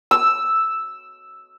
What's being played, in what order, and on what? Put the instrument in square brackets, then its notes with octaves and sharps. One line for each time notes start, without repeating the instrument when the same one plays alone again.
[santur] E6